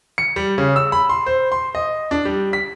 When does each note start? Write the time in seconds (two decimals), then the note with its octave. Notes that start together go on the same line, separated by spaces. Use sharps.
0.18 C#7
0.36 G3
0.58 C#3
0.76 E6
0.92 B5
1.09 C6
1.26 C5
1.52 C6
1.75 D#5
2.11 D4
2.25 G3
2.53 B6